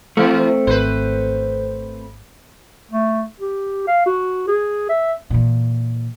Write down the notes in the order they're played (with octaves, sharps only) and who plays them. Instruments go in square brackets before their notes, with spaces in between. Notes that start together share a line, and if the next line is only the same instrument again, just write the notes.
[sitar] E3 [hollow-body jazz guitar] A3 C4
[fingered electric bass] G#1 [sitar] B4 C5
[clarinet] A3
G4
F5
F#4
G#4
E5
[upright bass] A#2 E3